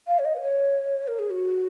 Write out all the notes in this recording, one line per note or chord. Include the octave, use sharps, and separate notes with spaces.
F5
C#5
D#5
B4
C#5
A#4
G#4
F#4